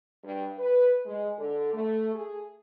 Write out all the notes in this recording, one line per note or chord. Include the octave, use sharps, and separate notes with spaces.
G2
B4
G#3
D3
A3
G#4